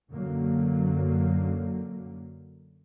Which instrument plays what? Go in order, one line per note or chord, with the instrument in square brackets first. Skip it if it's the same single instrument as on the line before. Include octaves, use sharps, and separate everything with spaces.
[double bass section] F#2 D3 F#3 A#3